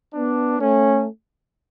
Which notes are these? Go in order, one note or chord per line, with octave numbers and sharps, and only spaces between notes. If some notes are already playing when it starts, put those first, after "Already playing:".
B3 D4
A3 C#4